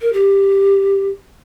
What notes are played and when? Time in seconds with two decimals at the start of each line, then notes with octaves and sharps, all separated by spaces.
0.01 A#4
0.13 G4